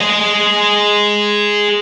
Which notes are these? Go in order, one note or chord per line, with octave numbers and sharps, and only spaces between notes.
G#4 D#5